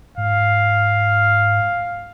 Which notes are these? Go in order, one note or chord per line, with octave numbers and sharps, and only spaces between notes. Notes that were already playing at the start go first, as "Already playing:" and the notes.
G#2 F5